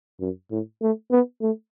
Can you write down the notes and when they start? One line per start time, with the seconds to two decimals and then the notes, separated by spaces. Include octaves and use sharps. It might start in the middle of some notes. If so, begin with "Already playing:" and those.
0.20 F#2
0.51 A2
0.82 A3
1.11 B3
1.42 A3